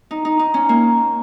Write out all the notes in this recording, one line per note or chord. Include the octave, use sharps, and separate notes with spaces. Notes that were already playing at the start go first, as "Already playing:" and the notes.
D#4
D#4
D#4
C#4
A#3